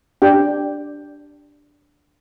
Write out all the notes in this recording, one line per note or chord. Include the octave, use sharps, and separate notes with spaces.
D4 G4 G5